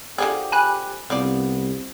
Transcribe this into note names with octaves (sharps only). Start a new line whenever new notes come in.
D3 F3 G4 G#4
G#5 B5 F#6
C2 F3 B3 D5